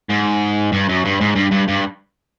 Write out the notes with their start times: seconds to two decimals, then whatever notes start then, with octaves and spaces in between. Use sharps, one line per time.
0.09 G#2
0.72 G2
0.89 F#2
1.05 G2
1.21 G#2
1.36 G2
1.52 G2
1.68 G2